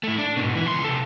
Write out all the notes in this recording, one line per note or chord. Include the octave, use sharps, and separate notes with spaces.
A3 E4
D4
G#2 B2
E3 E4
C#2 C6
C3 A4